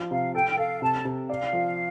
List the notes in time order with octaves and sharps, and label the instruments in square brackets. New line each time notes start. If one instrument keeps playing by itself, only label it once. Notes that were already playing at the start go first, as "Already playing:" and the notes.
Already playing: [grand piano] F3
[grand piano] C3 [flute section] F5
[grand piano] A4 [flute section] G5
[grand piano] A4 [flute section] F5
[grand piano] C3 [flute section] A5
[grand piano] C3
[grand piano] D5 [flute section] F5
[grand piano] F3